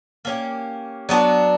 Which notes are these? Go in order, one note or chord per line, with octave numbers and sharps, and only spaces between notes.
A#3 C#4 G4
F#3 B3 D4 F#4